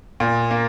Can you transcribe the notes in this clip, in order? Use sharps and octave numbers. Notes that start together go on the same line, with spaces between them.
A#2
A#3